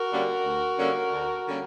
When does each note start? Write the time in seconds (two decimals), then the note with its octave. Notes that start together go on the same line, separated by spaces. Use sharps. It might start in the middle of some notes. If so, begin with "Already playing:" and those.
Already playing: F#4 A#4
0.11 D3 G3 A#3 C#4
0.44 D2
0.78 D3 G3 A#3 C#4
1.12 D2
1.46 D3 G3 A#3 C#4